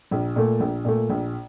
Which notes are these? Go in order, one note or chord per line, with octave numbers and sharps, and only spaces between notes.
A#1
A#2 A3
A#1
A#2 A3
A#1